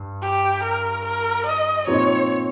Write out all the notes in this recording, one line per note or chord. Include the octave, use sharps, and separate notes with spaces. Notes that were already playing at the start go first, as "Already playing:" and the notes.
Already playing: G2
G4
A#4
A#4
D#5
A#2 F3 C4 D#4 C#5